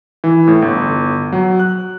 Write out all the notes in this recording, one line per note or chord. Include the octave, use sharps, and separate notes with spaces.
E3
A2
G1
F#3
F#6